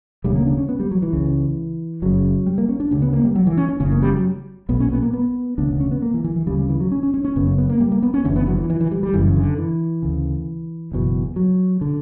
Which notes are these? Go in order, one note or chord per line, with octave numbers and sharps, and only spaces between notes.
E1 D2 C#3 G3
A#3
D4
C#4
B3
G3
F#3
E3
C#2 C#3
F#1 F#2 C#3 F#3
G3
A#3
C#4
D4
D2 C#3
B3
A#3
G3
F#3
E3
C#4
C#4
F#1 E2 C#3 C#4
A#3
G3
F#3
B1 A#2 B3
C#4
B3
A#3
B3
E1 D2 C#3 D4
C#4
B3
A#3
E3
E3
E3
D2 C#3 G3
G3
E3
F#3
C#4
C#4
C#4
C#4
F#1 F#2 C#3 B3
C#4
B3
A#3
G3
A#3
B3
C#4
F#1 E2 D3 C#4
B3
F#3
E3
E3
E3
G3
G3
F#1 F#2 C#3 E3
D3
E3
D2 C#3
F#1 E2 B2
F#3
D3